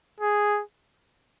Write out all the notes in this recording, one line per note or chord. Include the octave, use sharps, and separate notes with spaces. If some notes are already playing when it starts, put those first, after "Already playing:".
G#4